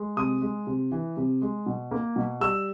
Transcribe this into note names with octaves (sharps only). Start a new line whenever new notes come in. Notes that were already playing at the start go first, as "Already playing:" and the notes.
Already playing: G#3
C3 D#6
G#3
C3
E3
C3
G#3
B2
A#3
B2
G3 E6